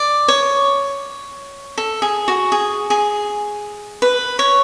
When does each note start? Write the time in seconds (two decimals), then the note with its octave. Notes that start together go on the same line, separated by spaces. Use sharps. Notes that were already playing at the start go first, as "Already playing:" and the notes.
Already playing: D5
0.28 C#5
1.78 A4
2.02 G#4
2.28 F#4
2.52 G#4
2.90 G#4
4.02 B4
4.39 C#5